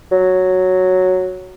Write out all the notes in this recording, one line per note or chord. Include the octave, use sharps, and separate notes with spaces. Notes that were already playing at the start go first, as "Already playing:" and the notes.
F#3